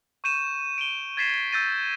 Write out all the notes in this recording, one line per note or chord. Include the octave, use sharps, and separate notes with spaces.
C#6 G6 D#7 E7
D7 E7 G7
G#6 A6 B6 C7 E7
E6 G6 A6 A#6 D#7